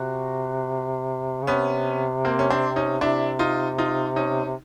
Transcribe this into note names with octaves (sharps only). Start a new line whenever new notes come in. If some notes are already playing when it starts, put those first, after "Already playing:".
Already playing: C3 F#4
C#3
C3 B3 C#4
A#3 C4
C#4
C4 D4
C#4 D#4
C3 D4 E4
D#4 F4
D#4 F4
C#4 D#4
C3